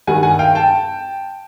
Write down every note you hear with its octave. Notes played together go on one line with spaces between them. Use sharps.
G2 D#3 G3 F#5 G#5
F#5 G#5
F5 G5
G5 A5